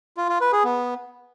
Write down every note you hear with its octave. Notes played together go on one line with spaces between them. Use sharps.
F4
F4
B4
G#4
B3